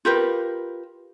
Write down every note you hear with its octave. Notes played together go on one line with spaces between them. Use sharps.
F4 G4 A#4 B4